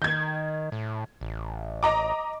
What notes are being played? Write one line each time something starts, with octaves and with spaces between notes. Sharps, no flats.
D#3 G6 G#6
A2
A1
D#5 A#5 D6